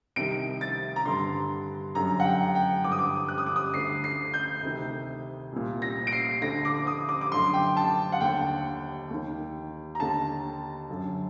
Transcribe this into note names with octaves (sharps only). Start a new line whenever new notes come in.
C2 C3 D#3 D7
A6
A#5
G2 D3 C6
F#2 D3 A#5
F#5
G5
G5
G2 D3 D6
D#6
D6
F#6
D#6
D6
D#6
D2 D3 C7
C7
G6
D2 C3 D#3
C2 A#2
A#6
D7
C7
D2 D3 A#6
D6
D#6
D6
D6
F#2 D3 C6
G5
A5
F#5
D#2 D3 G5
D#2 D#3
A#5
D#2 D3 A5
F#2 D3